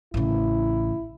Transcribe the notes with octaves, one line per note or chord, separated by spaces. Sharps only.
A1 C#3 E4